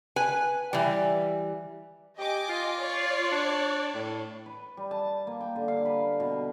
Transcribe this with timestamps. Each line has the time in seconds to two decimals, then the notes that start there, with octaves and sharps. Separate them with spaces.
0.16 B4 G#5
0.73 E3 G3
2.18 G4 D#5 G#5 D6
2.49 F4
2.81 C#5 D5
3.32 D4
3.94 A2
4.46 B4
4.77 G3
4.91 A5
5.27 A#3
5.41 G5
5.56 D3
5.68 F5
5.85 B4
6.20 B2